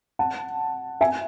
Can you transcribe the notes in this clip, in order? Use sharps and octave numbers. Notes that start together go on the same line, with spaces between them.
F#5 A5
E5 G#5